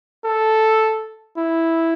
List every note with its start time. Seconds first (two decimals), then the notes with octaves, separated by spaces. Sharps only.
0.25 A4
1.38 E4